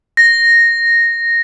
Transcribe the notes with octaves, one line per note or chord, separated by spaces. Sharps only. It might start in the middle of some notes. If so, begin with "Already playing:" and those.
A#6